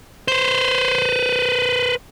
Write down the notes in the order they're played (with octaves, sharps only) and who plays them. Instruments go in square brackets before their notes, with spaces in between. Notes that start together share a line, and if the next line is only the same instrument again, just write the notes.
[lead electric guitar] B4 C5